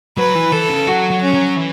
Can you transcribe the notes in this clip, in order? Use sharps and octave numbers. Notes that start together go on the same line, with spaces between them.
F#3 B4
E3
E3 A4
C#3
F#3 F#4
F#3
C#4
F#3
E3